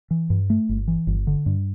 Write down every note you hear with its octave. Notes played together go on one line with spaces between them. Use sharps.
E3
G2
A3
G1
E3
G1
D3
G2